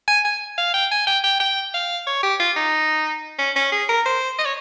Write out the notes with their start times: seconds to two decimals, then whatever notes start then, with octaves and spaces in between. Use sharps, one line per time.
0.08 G#5
0.25 G#5
0.58 F5
0.74 G5
0.91 G#5
1.07 G5
1.24 G5
1.40 G5
1.74 F5
2.07 C#5
2.23 G4
2.40 F4
2.56 D#4
3.39 C#4
3.56 C#4
3.72 G#4
3.89 A#4
4.06 C5
4.39 D#5
4.45 C#5